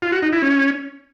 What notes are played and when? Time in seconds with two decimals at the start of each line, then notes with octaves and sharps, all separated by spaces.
0.02 F4
0.12 F#4
0.22 D#4
0.32 E4
0.42 C#4